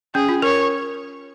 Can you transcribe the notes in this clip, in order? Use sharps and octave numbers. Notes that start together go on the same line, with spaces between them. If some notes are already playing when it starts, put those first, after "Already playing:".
C#4 G#4
F4
A#4 C#5